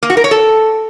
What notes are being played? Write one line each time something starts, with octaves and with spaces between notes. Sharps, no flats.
A#3
F#4
A#4
C#5
A4